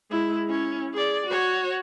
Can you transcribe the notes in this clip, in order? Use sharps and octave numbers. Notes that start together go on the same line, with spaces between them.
G#3 E4
C#4 E4
G#4 D5
F#4 C#5